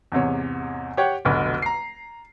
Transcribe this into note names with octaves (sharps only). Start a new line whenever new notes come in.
E2 G#2 C3 C#5
G4 C#5 F#5 G5
F1 B1 D3 F#4 B5
A#5 C7